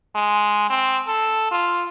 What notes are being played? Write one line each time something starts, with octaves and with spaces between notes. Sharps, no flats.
G#3
C4
A4
F4